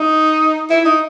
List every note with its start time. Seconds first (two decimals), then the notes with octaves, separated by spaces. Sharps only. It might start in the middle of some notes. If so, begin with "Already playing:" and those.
Already playing: D#4
0.70 E4
0.85 D#4